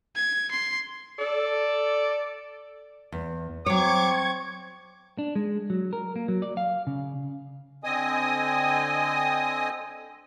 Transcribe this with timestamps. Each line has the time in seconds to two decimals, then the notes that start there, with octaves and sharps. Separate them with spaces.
0.16 G#6
0.51 C6
1.19 A4 D5
3.12 E2
3.66 F#3 C4 C#5 C#6 D6 G#6
5.19 D4
5.36 G#3
5.70 F#3
5.93 A#4
6.16 A#3
6.28 F#3
6.42 D5
6.57 F5
6.87 C#3
7.84 D3 C4 D#5 G#5 D#6